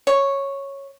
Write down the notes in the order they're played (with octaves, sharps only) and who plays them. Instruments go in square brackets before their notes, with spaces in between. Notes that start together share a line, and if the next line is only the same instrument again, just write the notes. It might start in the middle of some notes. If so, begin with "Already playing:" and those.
[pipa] C#5